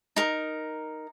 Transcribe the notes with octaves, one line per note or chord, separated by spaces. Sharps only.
D#4 A#4